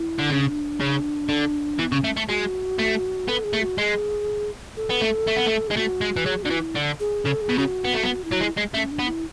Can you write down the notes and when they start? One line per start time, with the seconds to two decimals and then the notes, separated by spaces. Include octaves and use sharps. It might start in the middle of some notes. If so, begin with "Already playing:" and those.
Already playing: E4
0.19 D3
0.30 C#3 D4
0.80 C#3
1.29 D3
1.79 E3 B3
1.92 C#3
1.95 C#4
2.04 A3
2.17 A3
2.29 G#3 F#4
2.79 A3
3.28 B3 A4
3.44 G#4
3.53 A3
3.61 F#4
3.78 G#3 G#4
4.76 A4
4.90 B3
5.01 A3
5.27 A3
5.36 B3
5.46 A3
5.68 G#3 G#4
5.77 A3 F#4
6.01 G#3
6.17 E3
6.25 F#3 G#4
6.43 D3 F#4
6.51 E3
6.59 E4
6.76 D3
7.00 G#4
7.25 C#3 A4
7.41 G#4
7.49 B2
7.58 C#3 F#4
7.85 B3
7.94 A3
8.04 B3
8.24 E4
8.32 F#3
8.41 G#3
8.58 G#3
8.74 A3 C#4
8.91 D4
8.99 B3
9.07 E4